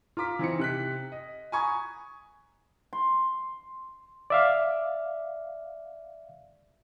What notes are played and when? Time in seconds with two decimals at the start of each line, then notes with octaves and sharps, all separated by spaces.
0.17 F4 A#5 D6 B6
0.39 E3 C4 D#4 C#7
0.59 C3 F#6 B6
1.12 D#5
1.52 G#5 A#5 B5 C#6 D#6 G#6
2.93 C6
4.30 D5 E5 F5